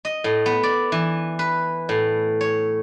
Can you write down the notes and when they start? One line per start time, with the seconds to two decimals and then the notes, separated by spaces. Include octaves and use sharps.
0.05 D#5
0.24 A2
0.46 B3
0.63 D5
0.92 E3
1.39 B4
1.89 A2
2.41 C#5